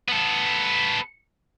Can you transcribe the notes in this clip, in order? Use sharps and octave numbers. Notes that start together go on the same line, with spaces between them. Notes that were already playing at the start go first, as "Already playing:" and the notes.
B3 A4